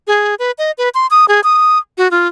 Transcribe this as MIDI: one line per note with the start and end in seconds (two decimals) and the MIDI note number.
0.07 0.35 68
0.39 0.51 71
0.58 0.71 75
0.78 0.89 71
0.95 1.07 84
1.11 1.26 87
1.28 1.41 68
1.44 1.78 87
1.98 2.08 66
2.11 2.27 65